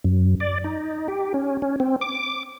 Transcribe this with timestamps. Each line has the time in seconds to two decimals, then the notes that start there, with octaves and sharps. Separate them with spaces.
0.04 F#2
0.40 D5
0.64 D#4
1.08 G4
1.34 C#4
1.62 C#4
1.80 C4
2.01 D6